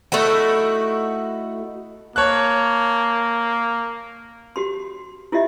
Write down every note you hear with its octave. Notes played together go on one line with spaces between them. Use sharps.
A3 D#4 E4 F#4
A#3 C#5 A5 F#6
F#4 G4 C6
E4 F4 G4 D#5 E5